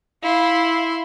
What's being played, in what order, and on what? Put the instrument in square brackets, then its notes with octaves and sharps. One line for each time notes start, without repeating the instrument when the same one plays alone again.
[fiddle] E4 C6 [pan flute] F5